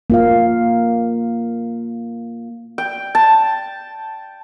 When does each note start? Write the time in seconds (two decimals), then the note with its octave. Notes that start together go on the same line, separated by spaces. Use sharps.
0.10 A#3 F4 F5
2.78 G5
3.15 A5